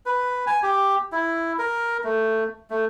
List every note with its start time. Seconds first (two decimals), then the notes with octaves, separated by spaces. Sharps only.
0.06 B4
0.47 G#5
0.63 G4
1.12 E4
1.59 A#4
2.04 A3
2.70 A3